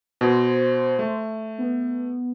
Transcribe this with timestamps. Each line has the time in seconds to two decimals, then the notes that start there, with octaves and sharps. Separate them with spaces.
0.21 B2 C5
0.99 A3
1.58 B3